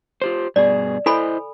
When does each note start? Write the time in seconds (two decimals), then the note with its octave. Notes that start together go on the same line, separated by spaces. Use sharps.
0.22 F4 G4 C5
0.56 G2 B2 G#4 D5
1.06 E4 A4 C5 D#5 G#5 B5